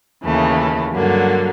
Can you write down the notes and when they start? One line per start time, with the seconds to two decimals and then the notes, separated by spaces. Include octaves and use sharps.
0.24 D#2 C#3 E3 A3
0.94 G2 D3 F#3 A#3